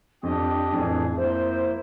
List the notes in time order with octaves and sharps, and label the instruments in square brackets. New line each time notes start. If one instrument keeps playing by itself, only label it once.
[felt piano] F2 [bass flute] D4 [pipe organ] G4 D#5
[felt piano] F2 [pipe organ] A2 E3 G#4
[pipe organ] A#3 E4 [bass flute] C5